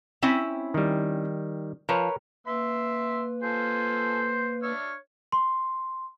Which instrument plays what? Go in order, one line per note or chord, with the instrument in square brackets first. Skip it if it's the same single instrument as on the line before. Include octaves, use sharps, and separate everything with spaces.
[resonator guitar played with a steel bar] C4 C#4 E4
[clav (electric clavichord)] D#3 G3
[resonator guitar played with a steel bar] F3 [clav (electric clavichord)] A#4 B4 C#5
[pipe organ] A#3 B4 [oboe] E5 [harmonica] C6 E6
[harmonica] F4 A4 G#5 [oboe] C5
[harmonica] D4 E5 F6 [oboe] C#5
[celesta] C6